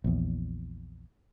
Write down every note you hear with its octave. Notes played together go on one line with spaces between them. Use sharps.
A#1 E2